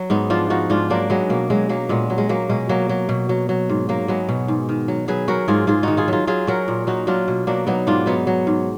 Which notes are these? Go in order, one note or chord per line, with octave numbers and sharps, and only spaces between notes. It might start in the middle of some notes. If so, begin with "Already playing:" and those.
Already playing: F#3 F#4
G#2 B3 D#4
F3 D4 F4
F3 D#4 F#4
G#2 D4 F4
F#3 A#3 D4
F#3 G#3 B3
B2 A#3
F#3 G#3
F#3 A#3
A#2 G#3 B3
F#3
G#3
F#3 A#3
B2 G#3
F#3 A#3
F#3
B2
F#3
F#3
G#2
F#3 A#3
F#3 G#3 B3
B2
G#2
D#3
F#3
F#3 G#4 B4
F#3 F#4 A#4
G#2 F4 G#4
G#2 F4 G#4
D#3 D#4 F#4
F4 G#4
F#3 F4 G#4
F#3 F4 G#4
F#3 F#4 A#4
A#2
F#3 D#4 F#4
F#3 D4 F4
B2
F#3 A#3 D4
F#3 B3 D#4
G#2 D4 F4
F#3 B3 D#4
F#3
G#2